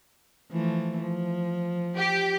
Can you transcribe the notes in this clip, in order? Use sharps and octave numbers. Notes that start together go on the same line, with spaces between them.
E3 F3 A3
F3
G4